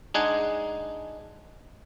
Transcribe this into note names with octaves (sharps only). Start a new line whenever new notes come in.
G#3 D4 D#4 F#5 G#5